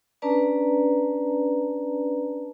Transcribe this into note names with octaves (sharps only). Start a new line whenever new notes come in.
C#4 D4 B4 D5 A5 A#5